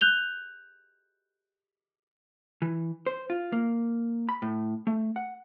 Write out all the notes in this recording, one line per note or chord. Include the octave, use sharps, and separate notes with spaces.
F#6 G6 F7 G7
E3
C5
F4
A#3
B5
A2
A3
F#5